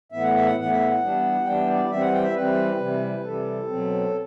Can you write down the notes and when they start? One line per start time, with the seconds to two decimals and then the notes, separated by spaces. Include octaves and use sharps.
0.12 A2 E3 B3 E5
0.23 F#5
0.34 E5
0.45 F#5
0.57 A2 E3 B3 F#5
0.72 E5
0.86 F#5
1.01 E3 G3 B3 D4
1.45 E3 G3 B3 D4 G5
1.67 D5
1.90 E3 G3 C4 E5
2.01 F#5
2.12 G5
2.23 E5
2.34 E3 G3 C4 B4
2.78 C3 E3 G3
3.23 C3 E3 G3 A4
3.68 B2 F#3 C4